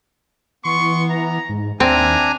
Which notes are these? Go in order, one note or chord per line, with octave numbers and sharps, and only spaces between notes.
E3 B3 C6 C#6
A#5
G#2
D#2 A#3 C4 D4 E5 G5 G#5 A#5